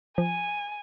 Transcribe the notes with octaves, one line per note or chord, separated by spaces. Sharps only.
F3 G#5